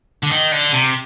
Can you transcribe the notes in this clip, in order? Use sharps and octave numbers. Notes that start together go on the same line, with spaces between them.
D3
D#3
D3
C3